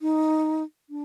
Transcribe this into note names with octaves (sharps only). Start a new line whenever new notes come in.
D#4
D4